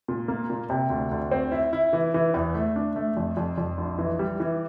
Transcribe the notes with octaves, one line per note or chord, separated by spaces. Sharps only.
A#2
A#3
A#2
C3
D2
D2
C4
E4
E4
E3
E3
E2
A3
D4
A3
F2
F2
F2
A#1
E3
G3
E3